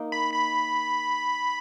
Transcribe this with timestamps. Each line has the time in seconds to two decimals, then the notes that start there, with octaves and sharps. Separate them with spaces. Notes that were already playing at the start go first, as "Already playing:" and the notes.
Already playing: A#3 D#4 A#4
0.12 B5
0.34 B5